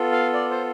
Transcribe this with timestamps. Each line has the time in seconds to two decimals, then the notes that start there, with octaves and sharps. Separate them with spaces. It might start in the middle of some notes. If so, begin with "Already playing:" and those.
Already playing: B3 F4 A4
0.12 F5
0.34 D5
0.51 C5